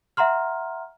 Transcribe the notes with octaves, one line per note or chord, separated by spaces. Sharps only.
E5 F#5 A#5 C6 F6